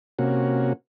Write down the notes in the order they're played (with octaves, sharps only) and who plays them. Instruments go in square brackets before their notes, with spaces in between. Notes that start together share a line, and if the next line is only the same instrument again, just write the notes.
[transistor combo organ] C3 A#3 C#4 F#4